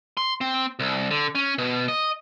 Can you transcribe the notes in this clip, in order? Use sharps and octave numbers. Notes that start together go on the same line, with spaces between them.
C6
C4
C2
D3
C#4
B2
D#5